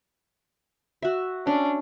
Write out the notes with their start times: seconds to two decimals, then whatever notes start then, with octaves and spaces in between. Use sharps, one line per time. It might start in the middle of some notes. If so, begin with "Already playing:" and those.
1.02 F#4 E5
1.47 C#4 D4